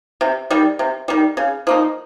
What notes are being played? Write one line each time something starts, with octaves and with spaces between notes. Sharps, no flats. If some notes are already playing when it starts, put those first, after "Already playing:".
C3
D#3 G3
C3
D#3 G3
C#3
F3 A#3 D#4